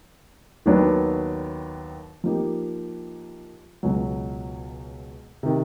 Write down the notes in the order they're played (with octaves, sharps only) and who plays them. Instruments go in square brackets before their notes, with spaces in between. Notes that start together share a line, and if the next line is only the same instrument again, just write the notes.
[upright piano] D#2 D#3 F#3 B3 D4
F3 A#3 D#4 G4
C#2 B2 F#3
C3 D#3